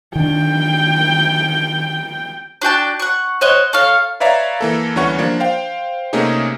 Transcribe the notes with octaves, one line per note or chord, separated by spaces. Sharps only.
D#3 D4 G5
D4 F#4 G5 A5
F#5 C#6
C5 C#5 D#5 F#5
A4 C#5 F5
B4 C#5 D5 E5 F5 A#5
E3 A#3 A4
D2 E3 G3 C#4 F#5 C#6
F3 A#3 D4
C5 F5 G5
C3 A3 A#3 C#4 D#4 G#4